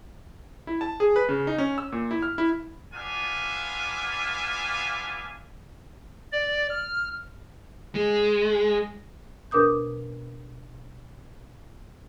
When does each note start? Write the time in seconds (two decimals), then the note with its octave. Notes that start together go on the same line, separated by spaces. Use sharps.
0.67 E4
0.81 A5
1.00 G#4
1.16 B4
1.29 C#3
1.47 D#4
1.58 C#4
1.78 E6
1.92 A#2
2.11 E4
2.22 F6
2.38 E4
2.94 B3 D4 F4 E5 F5 G#5
6.32 D5
6.69 F6
7.95 G#3
9.51 B2 D4 A#4 D6 D#6 G6